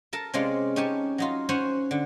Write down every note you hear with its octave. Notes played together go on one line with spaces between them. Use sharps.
A4 A#4 A5
C3 G#3 C#4 F4 D5
C#4 D#4 G4 C#5 G#5 A5
F#3 D#4 F4
C#4 C5 C#5 F#5 G#5
D3